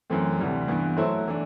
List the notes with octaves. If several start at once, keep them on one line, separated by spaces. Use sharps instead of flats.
F#2 E3 A3 C4
D2 C3 E3 G3
G2 E3 B3
F#3 A3 E4 A4 C5
E3 A3 D4